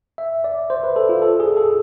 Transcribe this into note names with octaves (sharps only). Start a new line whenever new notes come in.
E5
D5
C5
B4
A4
F4
A4
G#4
A4